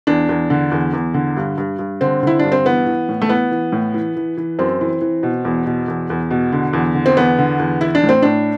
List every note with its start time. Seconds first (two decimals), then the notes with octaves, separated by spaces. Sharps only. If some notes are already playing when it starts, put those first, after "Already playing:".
0.07 E2 D4
0.29 E2
0.50 D3
0.72 E2
0.93 E2
1.14 D3
1.37 G2
1.58 G2
1.79 G2
2.01 D3 C4
2.23 D3 E4
2.39 G2 D4
2.52 C4
2.65 E3 B3
2.86 E3
3.09 A2
3.22 A3
3.29 E3 B3
3.51 E3
3.72 A2
3.94 E3
4.16 E3
4.37 E3
4.59 F#2 C4
4.81 E3
5.01 E3
5.23 B2
5.45 E2
5.66 B2
5.88 E2
6.10 E2
6.31 B2
6.52 D3
6.73 E2
6.95 D3
7.06 C4
7.17 E2 B3
7.38 D3
7.59 E2
7.81 E3 E4
7.95 D4
8.03 A2
8.09 C4
8.22 A2 D4